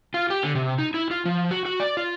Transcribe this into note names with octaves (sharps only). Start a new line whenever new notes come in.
F4
G4
D3
C3
D#4
E4
F4
F3
F#4
F#4
D5
F4